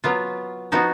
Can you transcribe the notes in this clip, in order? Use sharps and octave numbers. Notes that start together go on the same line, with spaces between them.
F#3 B3 F4
F3 B3 D#4 F#4